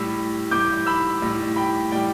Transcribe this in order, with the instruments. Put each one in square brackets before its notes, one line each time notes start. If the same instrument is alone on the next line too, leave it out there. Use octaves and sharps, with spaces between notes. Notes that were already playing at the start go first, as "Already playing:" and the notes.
Already playing: [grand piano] A2 G3 B5 E6
A2 G3 D6 G6
B5 E6
A2 G3
G5 B5
A2 G3 D5 G5